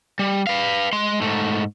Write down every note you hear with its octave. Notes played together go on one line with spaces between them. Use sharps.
G3
B4 F5
G#3 C6
G#2 A3